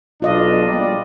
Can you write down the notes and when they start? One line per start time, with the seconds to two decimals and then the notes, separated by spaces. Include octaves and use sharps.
0.22 B1 D4 F4 D#5 F5
0.66 A#1 G3 D5